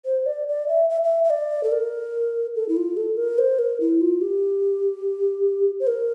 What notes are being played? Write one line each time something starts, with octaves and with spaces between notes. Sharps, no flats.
C5
D5
D5
E5
E5
E5
E5
D5
A4
A#4
A4
E4
F4
A4
A#4
C5
A#4
E4
F4
G4
C5
A#4